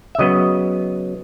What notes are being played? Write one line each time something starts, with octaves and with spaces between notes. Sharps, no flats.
E5
C#3 F#3 B3 D#5